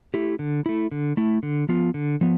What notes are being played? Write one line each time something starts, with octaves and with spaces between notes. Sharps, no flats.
A3 E4 G4
D3
A3 E4
D3
A3 E4
D3
F3 B3 F4
D3
F3 B3